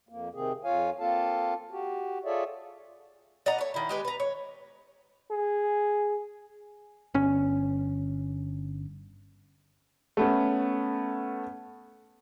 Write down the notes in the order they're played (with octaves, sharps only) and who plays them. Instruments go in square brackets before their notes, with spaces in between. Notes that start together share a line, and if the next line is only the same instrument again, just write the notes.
[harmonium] F2 A#3
C3 D#3 C4 G#4
F2 F4 C#5 F5 G#5
A#3 C4 F4 A4 F5 A5
F#4 G4
F4 G#4 A4 C#5 D5 E5
[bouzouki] D5 D#5 F#5 A#5
A3 C#5
D#3 E4
G#3 G4 B4
B4 A#5
C#5
[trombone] G#4
[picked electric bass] G1 C#4
[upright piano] A3 B3 C#4